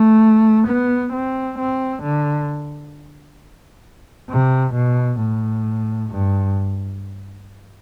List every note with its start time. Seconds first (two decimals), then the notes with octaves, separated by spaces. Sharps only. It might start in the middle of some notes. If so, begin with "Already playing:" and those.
Already playing: A3
0.67 B3
1.13 C4
1.58 C4
2.03 D3
4.29 C3
4.74 B2
5.19 A2
6.10 G2